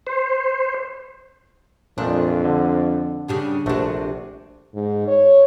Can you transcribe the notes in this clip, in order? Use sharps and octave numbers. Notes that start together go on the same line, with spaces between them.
C5
F2 A#2 F3 A3 D4
D3
C#3 G3 D4
A#1 C3 A3 D4 F#4
G#2
C#5